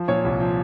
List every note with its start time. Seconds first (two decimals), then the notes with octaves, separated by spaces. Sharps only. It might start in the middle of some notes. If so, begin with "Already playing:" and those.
Already playing: F3
0.08 A#2 C#5
0.25 C2
0.40 F3